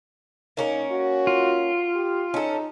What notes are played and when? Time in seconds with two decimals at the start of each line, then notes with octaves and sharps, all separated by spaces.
0.57 A#3 C#4 D#4 A#4
0.91 F#4
1.27 F4
1.95 G4
2.34 C#4 D#4 A4